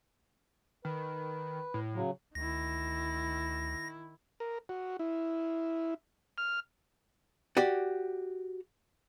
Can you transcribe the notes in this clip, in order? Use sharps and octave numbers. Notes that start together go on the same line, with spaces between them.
D#3 B4
A2
C#3 F#3
D2 D#3 E4 A#6
A#4
F#4
E4
F6
F#4 G4 D5